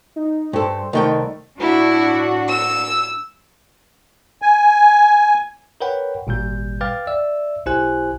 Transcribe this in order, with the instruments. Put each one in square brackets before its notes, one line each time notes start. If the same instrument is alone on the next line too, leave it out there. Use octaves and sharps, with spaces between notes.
[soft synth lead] D#4
[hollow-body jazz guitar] G2 A4 [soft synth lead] C5
[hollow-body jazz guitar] C2 A3 G5 [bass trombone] D#3
[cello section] A2 D4 F#4 [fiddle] E4
[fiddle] E6
[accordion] G#5
[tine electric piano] A#4 B4 C#5 F#5 G5 B5
G#1 A#2 G3 G6
B4 F5 G5 D6 F6 A6
D5 E5 E6
B1 E4 G4 C5 G#5 F#6